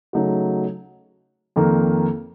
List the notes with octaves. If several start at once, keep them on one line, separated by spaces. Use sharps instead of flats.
C#3 F#3 A3 D#4 F#4
F2 D#3 A#3